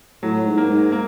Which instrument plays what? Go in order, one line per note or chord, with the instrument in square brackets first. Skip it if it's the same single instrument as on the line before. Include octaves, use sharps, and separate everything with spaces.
[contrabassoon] A2 [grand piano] F#3
[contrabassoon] G#2
[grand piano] A#3
[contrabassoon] G#2
[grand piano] A#3